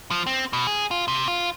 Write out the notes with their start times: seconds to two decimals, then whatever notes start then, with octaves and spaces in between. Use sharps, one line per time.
0.11 F3
0.27 C4
0.53 B2
0.67 G#4
0.91 F4
1.08 C3
1.28 F4